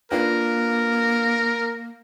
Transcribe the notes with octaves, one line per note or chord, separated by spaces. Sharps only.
A#3 D4 F4 A#4 B4